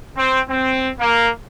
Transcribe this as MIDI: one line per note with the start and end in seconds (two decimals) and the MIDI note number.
0.18 0.40 60
0.50 0.90 60
1.00 1.29 58